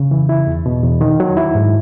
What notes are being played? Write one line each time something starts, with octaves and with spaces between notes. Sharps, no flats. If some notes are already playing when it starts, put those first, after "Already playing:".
Already playing: C#3
E3
E4
E2
B2
E2
D#3
F#3
E4
G#2